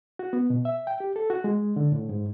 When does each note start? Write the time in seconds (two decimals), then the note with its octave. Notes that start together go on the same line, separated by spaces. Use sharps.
0.19 F#4
0.33 B3
0.50 B2
0.65 E5
0.87 G5
1.00 G4
1.16 A4
1.30 F#4
1.44 G#3
1.76 D3
1.92 A2
2.09 G#2